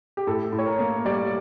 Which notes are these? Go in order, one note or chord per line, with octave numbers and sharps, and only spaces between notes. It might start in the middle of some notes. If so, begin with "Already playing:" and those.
G4
A2 A4
A2
C#5
A#4
A#3
G3 D5